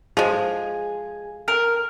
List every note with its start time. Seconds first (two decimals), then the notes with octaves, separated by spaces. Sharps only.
0.17 F3 G#3 G#4
1.48 A#4